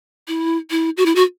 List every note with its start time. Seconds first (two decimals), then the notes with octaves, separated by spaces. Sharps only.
0.28 E4
0.70 E4
0.97 F#4
1.06 E4
1.15 F#4